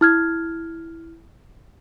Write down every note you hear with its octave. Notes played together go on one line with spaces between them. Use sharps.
E4 F6 G#6